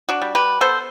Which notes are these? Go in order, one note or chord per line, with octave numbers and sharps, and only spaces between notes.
D4 F#4
G3
G4 B4
B3 A4 C5